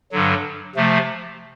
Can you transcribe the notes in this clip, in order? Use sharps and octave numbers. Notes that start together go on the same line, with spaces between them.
G2 D3 F#3
C3 F3 A3